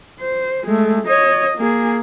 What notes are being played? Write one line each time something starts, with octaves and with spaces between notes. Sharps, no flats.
C5
G#3 A3
C#5 D#5
A#3 G#4